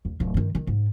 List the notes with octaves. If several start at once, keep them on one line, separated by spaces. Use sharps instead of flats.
D#2
D1
G2 D#3
D#3
G#2